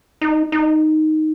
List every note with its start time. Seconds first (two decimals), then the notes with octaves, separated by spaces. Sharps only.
0.21 D#4
0.52 D#4